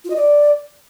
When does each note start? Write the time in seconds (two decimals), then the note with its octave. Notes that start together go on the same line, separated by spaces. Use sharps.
0.04 F4
0.10 D#5
0.16 D5